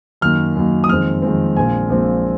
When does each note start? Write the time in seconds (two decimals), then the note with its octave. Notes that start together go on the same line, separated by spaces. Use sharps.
0.21 F#2 D#3 A#3 F6
0.56 F#2 D#3 A#3
0.84 D#6
0.89 F2 D#3 G#3 C4 F6
1.22 F2 D#3 G#3 C4
1.57 A#1 A#2 G#3 C4 G#5
1.90 A#1 A#2 G#3 C4